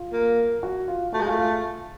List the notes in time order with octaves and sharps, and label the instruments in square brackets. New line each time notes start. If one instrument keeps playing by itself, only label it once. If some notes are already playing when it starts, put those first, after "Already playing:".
Already playing: [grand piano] F4
[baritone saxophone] A#3
[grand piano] F#4
F4
[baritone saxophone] A3 [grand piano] F#4
[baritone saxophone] G#3
[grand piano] F4
[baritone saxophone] A3
[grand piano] F4